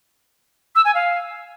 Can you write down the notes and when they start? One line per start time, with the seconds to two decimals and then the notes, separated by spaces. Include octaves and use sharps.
0.76 E6
0.85 G#5
0.95 F5